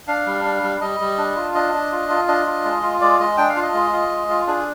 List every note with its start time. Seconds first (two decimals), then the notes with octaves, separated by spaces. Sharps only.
0.08 D4 F5
0.26 G3
0.45 D4
0.63 G3
0.81 G3 D#5
1.00 G3
1.18 D4
1.36 F4
1.54 D4 D#5
1.73 D4
1.92 F4
2.09 F4
2.28 D4 D#5
2.46 F4
2.64 G#3
2.83 F4
3.01 G#3 D5
3.20 G#3 D#5
3.38 D4 G5
3.49 F5
3.56 F4
3.62 D#5
3.74 G#3
3.93 F4
4.11 G#3
4.29 F4
4.47 D4 G#4